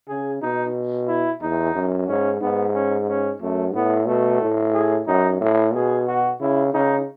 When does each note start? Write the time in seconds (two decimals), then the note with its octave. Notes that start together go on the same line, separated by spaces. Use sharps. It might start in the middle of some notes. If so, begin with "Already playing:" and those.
0.09 C#3 G#4
0.42 B2 D#4
1.08 E4
1.42 E2 D#4
1.75 F#2
2.08 G#2 C#4
2.41 G#2 B3
2.74 C#4
3.08 C#4
3.41 F#2 A3
3.74 A2 B3
4.08 B2 A3
4.41 A2
4.74 G#4
5.07 F#2 D#4
5.41 A2 E4
5.74 B2 G#4
6.07 F#4
6.41 C#3 E4
6.73 C#3 D#4